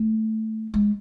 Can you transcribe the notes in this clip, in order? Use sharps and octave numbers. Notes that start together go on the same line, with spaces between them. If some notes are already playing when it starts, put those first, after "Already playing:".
Already playing: A3
G#3